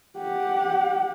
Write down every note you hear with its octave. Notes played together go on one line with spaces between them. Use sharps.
G4 F#5